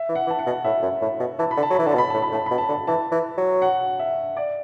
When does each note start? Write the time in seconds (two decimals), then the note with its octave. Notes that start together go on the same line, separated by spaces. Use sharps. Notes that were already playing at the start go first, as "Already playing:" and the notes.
Already playing: E5
0.09 E3
0.15 F#5
0.27 E3
0.30 A5
0.39 F#5
0.46 B2
0.64 A2 E5
0.82 F#2
1.02 A2
1.20 B2
1.39 E3 A5
1.51 B5
1.57 D3
1.63 A5
1.70 F#3
1.75 E3 B5
1.86 D3 A5
1.95 B2
1.98 B5
2.10 A2 A5
2.22 B5
2.32 A2
2.35 A5
2.46 B2 B5
2.58 A5
2.69 D3
2.87 E3 A5
3.12 E3
3.37 F#3
3.62 F#5
3.99 E5
4.37 D5